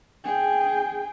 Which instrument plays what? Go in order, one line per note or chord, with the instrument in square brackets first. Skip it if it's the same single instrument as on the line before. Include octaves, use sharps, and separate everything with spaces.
[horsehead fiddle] G#4 G5